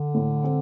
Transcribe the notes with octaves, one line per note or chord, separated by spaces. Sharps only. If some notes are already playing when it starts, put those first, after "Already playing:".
Already playing: D3
A2
C4